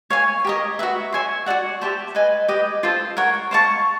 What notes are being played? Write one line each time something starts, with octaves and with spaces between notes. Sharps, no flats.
C#5 F5 G#5
G4 A#4 D#5
F#4 B4 E5
C#5 E5 G#5 C6
F#4 A4 D5 F#5
G4 C5 E5 A5
B4 D#5 G#5
G4 B4 D#5
F4 A4 C5
A#4 C#5 F#5
C5 F5 A5 C#6